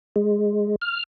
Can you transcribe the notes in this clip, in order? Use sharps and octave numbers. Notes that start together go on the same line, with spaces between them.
G#3
F6